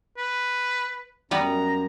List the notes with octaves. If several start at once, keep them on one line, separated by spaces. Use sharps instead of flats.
B4
F#2 G3 B3 B4 A#5